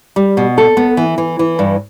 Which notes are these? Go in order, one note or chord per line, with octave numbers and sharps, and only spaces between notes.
G3
B2
A4
B3
E3
E3
E3
G2